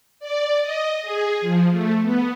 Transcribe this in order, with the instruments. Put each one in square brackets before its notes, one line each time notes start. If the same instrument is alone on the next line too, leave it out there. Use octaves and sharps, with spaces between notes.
[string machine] D5
D#5
G#4
F3
A3
B3